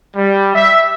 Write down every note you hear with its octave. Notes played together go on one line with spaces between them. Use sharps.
G3
E5